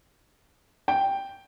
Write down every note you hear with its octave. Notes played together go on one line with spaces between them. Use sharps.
G5